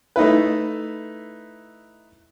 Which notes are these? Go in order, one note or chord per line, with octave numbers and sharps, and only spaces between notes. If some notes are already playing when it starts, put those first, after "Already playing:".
A3 D#4 E4 B4